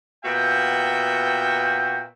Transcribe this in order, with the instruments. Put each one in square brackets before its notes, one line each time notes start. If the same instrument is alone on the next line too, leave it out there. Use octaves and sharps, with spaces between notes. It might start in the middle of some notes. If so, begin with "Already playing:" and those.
[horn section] A#2 B3 F#4 E5 G5